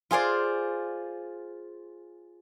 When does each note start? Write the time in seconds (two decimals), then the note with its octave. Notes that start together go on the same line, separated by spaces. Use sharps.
0.11 F4 G#4 C5 D5